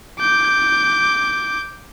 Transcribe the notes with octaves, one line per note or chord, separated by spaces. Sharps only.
D6 G6